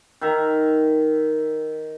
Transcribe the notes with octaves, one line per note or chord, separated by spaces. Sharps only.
D#3 E5 A#5